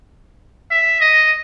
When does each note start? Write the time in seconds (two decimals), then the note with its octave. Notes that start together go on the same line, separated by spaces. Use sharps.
0.71 E5
1.00 D#5